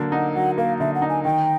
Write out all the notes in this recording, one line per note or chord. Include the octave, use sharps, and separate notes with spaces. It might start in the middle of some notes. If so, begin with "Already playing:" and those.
Already playing: D3 F#3 A#3
D#4 F#5
F#3 F#5
A#3 F5
D3 E5
F#5
D#4
G#5
D#3 G5